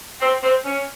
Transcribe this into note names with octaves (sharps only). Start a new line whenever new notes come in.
C4
C4
C#4